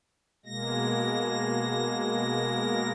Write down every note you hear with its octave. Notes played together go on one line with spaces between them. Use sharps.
B2 G#3 A#3 A#6